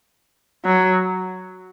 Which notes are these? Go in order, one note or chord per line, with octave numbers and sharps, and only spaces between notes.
F#3